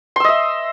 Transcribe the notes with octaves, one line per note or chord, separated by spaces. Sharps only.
D#5 E5 C6 E6